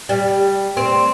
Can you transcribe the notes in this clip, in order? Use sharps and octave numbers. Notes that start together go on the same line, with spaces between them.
G3
C4